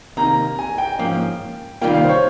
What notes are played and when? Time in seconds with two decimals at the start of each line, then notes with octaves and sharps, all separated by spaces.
0.17 C3 D#3 A#3 A#5
0.59 G#5
0.78 G5
0.99 G#2 F3 A#3 C#4
1.81 C3 D#3 G3 A#3 F4 G5
1.94 F5
2.04 C5
2.09 C#5